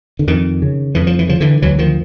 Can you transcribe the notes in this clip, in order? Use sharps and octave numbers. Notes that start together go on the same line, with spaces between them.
D3
F2 D#3
C#3
F2 E3
F3
E3
C#3 F3
D3 E3
D2 E3 F#3
D#3 F3